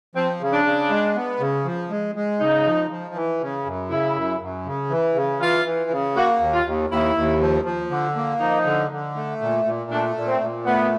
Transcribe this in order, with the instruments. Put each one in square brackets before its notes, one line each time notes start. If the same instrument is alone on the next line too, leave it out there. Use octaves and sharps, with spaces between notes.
[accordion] F3 [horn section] C4
[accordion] C#3
[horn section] D4
[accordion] C#3
G#3
B3
C#3
F3
G#3
G#3
[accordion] C#3 [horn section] D#4
[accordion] F3
F3
E3
C#3
F#2
[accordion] C#3 [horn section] E4
[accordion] F#2
F#2
C#3
E3
C#3
[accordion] E3 [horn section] F4
[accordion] E3
C#3
[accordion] A#3 [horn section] F#4
[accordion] D#2
[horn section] F4
[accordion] D#2
[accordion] D#2 [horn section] E4
[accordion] D#2
F3
F3
D3
A#3
[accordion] F3 [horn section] D#4
[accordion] D3
D3
A3
A#2
A#2
[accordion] A3 [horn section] D4
[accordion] A#2
[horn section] C4
[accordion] A#2
[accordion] A3 [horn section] B3